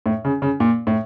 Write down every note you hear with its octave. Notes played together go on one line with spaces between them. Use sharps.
A2
C#3
C#3
A#2
A2